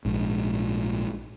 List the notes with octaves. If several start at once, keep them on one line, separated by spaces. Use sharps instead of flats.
A#1 G#2